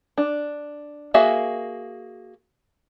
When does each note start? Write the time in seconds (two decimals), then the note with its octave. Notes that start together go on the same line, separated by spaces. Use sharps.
0.18 D4
1.14 A#3 F#4 G#4 E5 F5